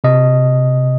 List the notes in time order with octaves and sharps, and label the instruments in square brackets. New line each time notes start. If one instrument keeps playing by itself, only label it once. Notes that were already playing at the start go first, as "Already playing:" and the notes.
[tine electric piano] C3 D#5